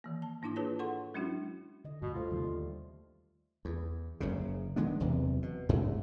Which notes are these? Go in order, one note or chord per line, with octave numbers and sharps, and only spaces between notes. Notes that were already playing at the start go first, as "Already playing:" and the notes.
D#3 E3 A#3
A5
G#2 A#3 D4 E4 D6
F4 G#4 B4 C#5 A5 D6
A4 F#5 C6 C#6
F#3 G#3 C#4 D4 E4 F#4
D3 D#5
D2 G2 B2
A3 F4 A4 C5
D#2 C3 D#3 G3
D#2
E2
F#1 F#2 C#3
D#3 G#3 B3 D4
F#1 E2 C3 E3
B2
C2 G2 G#3 A3